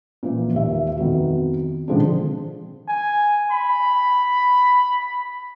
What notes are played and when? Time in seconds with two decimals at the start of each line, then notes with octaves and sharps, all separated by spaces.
0.23 A#2 E3 F3
0.54 D#2 E5
0.97 F2 D#3 B3 F#4
1.88 D3 D#3 F3 G#3 C4 D4
2.88 G#5
3.51 B5